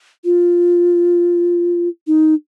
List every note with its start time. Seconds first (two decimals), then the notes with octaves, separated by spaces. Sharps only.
0.25 F4
2.07 D#4